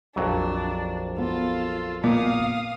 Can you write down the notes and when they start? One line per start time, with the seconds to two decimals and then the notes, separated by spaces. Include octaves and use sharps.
0.16 A#1 F2 F#3 D4
1.18 B3 F4 A4
2.04 A#2 A#3 B3 F5 D#6